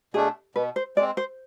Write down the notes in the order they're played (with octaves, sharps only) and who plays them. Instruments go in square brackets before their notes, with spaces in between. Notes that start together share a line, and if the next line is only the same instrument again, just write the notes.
[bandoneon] B2 A3 D4 [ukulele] G#4
[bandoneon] B2 [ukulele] B4
[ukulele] C5
[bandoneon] G#3 [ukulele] D5
[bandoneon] C4
[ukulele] C5